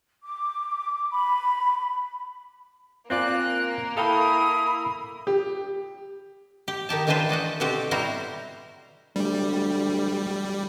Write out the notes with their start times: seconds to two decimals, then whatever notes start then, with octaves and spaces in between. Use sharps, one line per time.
0.24 D6
1.11 B5
3.10 A#3 C4 F4 D5 G#5 F#6
3.97 E4 A4 F5 G5 B5 D#6
5.27 G4
6.68 G4
6.89 D#3 D#4 G4 A5
7.07 D#3 E3 D4 F4 B4 C5
7.29 F#4 D5 D#5 F#5
7.60 B2 D3 C4 F#4 G4
7.91 B2 G3 E4 F#4 C5 A#5
9.16 D2 G3